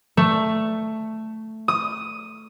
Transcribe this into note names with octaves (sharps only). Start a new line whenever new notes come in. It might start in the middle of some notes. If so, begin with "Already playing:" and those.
A3
D#6